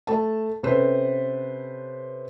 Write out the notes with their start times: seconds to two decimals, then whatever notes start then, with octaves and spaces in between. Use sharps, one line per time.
0.07 A3 A5
0.63 C3 C#4 A4 B4 C5